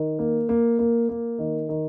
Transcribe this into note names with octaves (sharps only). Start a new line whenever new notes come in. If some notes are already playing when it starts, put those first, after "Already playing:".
Already playing: D#3
A#3
A#3
A#3
A#3
D#3
D#3